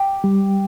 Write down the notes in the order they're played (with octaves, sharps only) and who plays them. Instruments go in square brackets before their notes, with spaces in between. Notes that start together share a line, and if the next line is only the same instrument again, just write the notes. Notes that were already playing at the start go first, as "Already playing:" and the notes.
Already playing: [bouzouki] G4
[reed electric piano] G3